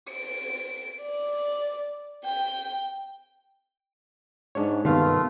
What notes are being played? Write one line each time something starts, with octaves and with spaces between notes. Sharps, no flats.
D7
D5
G5
G#2 D4 C#5
G2 C3 D#3 G3 A3 B3 F4 F5